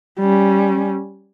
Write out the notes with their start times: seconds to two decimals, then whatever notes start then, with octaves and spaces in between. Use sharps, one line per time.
0.19 G3 C#4